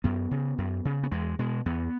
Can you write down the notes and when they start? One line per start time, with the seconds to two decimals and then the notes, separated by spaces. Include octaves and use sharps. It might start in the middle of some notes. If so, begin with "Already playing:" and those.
0.04 F#2 B3
0.31 C#3
0.58 F#2
0.85 C#3
1.03 B3
1.12 E2 G#3
1.39 B2 G#3
1.66 E2 B3